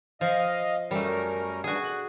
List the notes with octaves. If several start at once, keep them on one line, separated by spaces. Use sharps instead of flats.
F3 D#5 F5
F#2 G3 A3 C#4 A#4
B2 D4 F#4 G#4
F#6